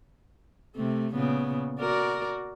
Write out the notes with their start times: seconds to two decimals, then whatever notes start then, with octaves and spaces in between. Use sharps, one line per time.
0.76 C3 A3
1.12 A#2 C#3 B3
1.80 F#4 A#4 D5